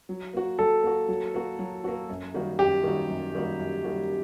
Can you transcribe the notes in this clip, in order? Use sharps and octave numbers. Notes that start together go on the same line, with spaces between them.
F#3
A#3 F#4
F#3 A4
A#3 F#4
F#3
A#3 F#4
F#3
A#3 F#4
F#2
D#3 G3 A#3 F#4
F#2 G4
D#3 G3 A#3 F#4
F#2
D#3 G3 A#3 F#4
F#2
D#3 G3 A#3 F#4